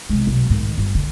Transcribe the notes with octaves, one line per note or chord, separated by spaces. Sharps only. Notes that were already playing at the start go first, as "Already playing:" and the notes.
C3 G#3
B1
G#2 D#3
G1
D3